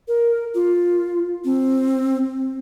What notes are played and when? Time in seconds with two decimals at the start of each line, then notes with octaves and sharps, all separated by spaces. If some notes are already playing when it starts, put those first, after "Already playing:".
0.08 A#4
0.55 F4
1.45 C4